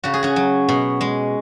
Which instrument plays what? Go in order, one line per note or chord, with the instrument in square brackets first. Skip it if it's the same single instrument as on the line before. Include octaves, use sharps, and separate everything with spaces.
[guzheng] C#3 F#4
G#4
C#4 F#4
F#3
B2
G#3